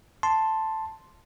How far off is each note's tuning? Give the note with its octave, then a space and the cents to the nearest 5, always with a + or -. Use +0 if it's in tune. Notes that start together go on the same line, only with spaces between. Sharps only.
A5 +0 C6 +0